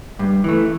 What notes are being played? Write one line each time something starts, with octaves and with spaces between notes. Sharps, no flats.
G2
E3 A3